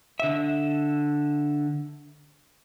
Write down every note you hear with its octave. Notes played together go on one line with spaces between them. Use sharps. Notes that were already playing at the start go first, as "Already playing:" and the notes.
D3 E5